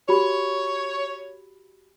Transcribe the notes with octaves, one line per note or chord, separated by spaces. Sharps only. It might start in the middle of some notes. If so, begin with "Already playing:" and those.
F#4 G4 C#5 B5